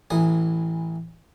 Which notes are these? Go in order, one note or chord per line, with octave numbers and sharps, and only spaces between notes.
A1 E3 G#5 D#6